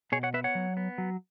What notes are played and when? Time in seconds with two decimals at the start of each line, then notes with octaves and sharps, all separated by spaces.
0.12 B2 G#4 C#5
0.23 C#5 F#5
0.34 B3 B4 E5
0.44 C#5 F#5
0.55 F#3
0.77 B3
0.98 F#3